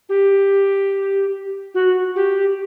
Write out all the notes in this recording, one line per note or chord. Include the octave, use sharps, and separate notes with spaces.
G4
F#4
G4